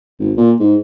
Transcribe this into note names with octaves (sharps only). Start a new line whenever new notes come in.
G#1
A#2
G#2